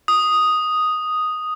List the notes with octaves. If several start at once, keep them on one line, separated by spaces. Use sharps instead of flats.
D#6